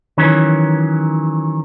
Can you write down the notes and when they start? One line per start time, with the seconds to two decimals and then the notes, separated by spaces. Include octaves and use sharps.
0.18 D#3 E3 F#3 C#4